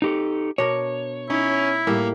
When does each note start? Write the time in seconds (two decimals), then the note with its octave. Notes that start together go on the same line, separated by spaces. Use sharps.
0.02 D#4 G4 A4
0.58 B2 D4 A#4 C#5
1.30 C#4 D#4 E4
1.87 A2 G3 A#3